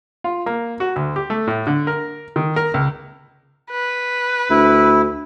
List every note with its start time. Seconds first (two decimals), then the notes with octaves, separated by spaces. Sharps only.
0.24 F4
0.46 A#3
0.80 F#4
0.96 D2
1.16 G4
1.30 A3
1.47 A2
1.67 D3
1.87 A#4
2.36 D#3
2.56 A#4
2.74 C#2
3.71 B4
4.50 D2 E4